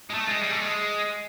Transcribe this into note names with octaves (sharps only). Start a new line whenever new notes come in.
G#3
A3
G#3
G3
A3
G#3